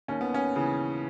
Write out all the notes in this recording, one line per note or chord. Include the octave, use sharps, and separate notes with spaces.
D#2 C#4
B3
C#4
C#3 E3